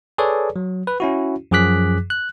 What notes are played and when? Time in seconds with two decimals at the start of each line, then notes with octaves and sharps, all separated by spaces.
0.18 G#4 A4 B4 C#5 D5
0.56 F#3
0.87 B4
1.00 C#4 E4 F#4
1.51 F#2 F3 G#4 D6 F#6 B6
2.10 F#6